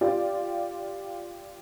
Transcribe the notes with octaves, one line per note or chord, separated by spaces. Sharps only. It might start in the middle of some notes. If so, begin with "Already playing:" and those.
F4 G4 D5